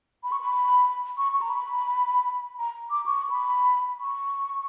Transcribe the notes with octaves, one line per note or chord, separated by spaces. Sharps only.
B5
C#6
B5
C#6
C#6
A#5
B5
A#5
D6
C#6
B5
C#6